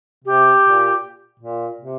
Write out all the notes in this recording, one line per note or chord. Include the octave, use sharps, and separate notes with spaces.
C3 G4
A#2
A#2
C3